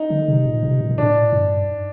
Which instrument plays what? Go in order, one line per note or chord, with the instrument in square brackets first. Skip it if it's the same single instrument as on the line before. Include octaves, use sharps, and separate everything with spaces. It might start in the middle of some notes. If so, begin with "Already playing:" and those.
Already playing: [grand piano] D#4
[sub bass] D3
C3
A#2
C3
A#2
A#2
[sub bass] A2 [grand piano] D4
[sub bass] G2